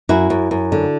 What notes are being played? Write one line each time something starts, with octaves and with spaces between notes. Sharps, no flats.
F#2 E4 F#4
F#2
F#2
D3